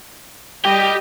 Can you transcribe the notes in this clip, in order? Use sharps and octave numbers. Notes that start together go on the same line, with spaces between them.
G3 G4 D#5 G5